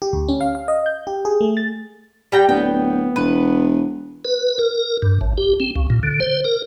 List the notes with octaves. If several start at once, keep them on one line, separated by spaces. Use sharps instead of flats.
G4
D2
C#4
F5
F5
D#5
G6
G4
G#4
A3
A6
G3 G5 A#5
D1 B3 G5
E1 B4
B4
A#4
G2
A1
G4
C4
C#2
A#2
D3
C5
A#4